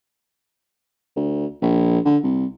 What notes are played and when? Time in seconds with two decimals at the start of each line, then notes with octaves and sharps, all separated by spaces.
1.16 D2
1.62 A#1
2.05 D3
2.24 C2